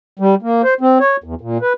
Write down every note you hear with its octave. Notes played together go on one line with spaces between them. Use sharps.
G3
A#3
C5
C4
C#5
E2
A#2
B4